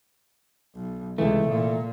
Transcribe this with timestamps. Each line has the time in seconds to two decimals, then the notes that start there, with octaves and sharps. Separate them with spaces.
0.75 B1
1.18 C#2 C3 E3 A3
1.50 A#2